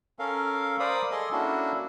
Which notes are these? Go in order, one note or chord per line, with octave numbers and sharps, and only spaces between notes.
C#4 A4 A#4 F5
A#4 C5 D5 F5 B5 D#6
G#4 A4 D#5 C6
A#3 C#4 D4 E4 F#4 A4